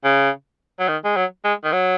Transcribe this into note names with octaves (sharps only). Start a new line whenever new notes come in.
C#3
F#3
D#3
G#3
F#3
G#3
D#3
F#3